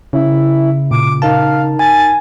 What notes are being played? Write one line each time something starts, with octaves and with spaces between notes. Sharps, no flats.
C#3 E4
A#2 D6
D#4 A#4 F5 A5
G#5 A6